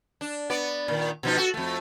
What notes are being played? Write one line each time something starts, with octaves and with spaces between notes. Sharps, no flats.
D4
B3 D5
A#2 D#3
B2 F3 D#4
F#4 A4
F2 A3